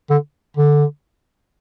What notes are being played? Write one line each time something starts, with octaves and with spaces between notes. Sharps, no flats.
D3
D3